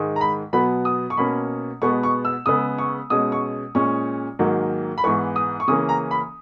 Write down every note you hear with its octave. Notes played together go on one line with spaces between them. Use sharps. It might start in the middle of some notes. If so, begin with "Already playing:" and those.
Already playing: G#2 D#3 G#3
A#5
B5
B2 F#3 B3 B5
D#6
C#6
B2 A#3 C#4 B5
B2 G#3 B3 C#6
C#6
E6
C#3 G#3 B3 D#6
C#6
B2 G#3 C#4 D#6
C#6
A#2 G#3 C#4 C#6
G#2 D#3 F#3 A#3
B5
G#2 E3 B3 C#6
D#6
C#6
C#3 E3 A#3 C#4 D#6
A#5
B5